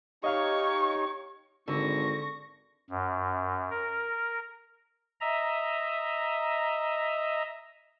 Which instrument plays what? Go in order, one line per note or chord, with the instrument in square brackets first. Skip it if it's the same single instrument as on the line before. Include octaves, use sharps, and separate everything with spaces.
[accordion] D#4 C#5 [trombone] G4 [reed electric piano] D#5 F5 F6 [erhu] C#6
[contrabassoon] G#1 [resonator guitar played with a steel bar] D3 [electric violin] C#6 A#6
[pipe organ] F#2
A#4
D#5 E5 A#5